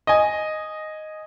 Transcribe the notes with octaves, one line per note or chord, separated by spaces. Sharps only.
D#5 G#5